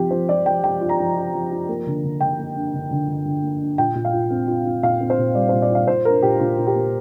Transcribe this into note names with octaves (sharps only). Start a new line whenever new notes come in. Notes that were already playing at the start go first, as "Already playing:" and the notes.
Already playing: F3 C4 F4 G4
F3 C5
F3 D5
F3 G5
F3 G5
F4
A#5
F3
F4
F3
F4
A#3
D3
D3
D3 G5
A#3
D4
D3
D3
D3
D3
A#3
D4
A#2 G5
A#2
F5
F4
C4
F4
F4
A#2 F5
C4
C5
A#2
G3 D5
A#2 C5
D5
F4 F5
A#2 C5
D4 A#4
A#2 G4
A#2 F4
A#2
G4
A#3